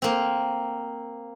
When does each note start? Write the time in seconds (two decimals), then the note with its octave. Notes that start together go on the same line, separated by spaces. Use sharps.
0.02 A#3 C4